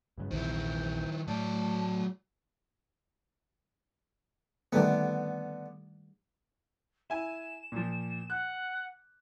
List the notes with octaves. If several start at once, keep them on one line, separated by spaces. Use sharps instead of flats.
G2 C#3
A#1 E2 C3 D#3 E4 C5
A2 F#3 D5 A5
D3 D#3 G3 A3 B3
E4 G#5 E7
A#2 F3
F#5 F#6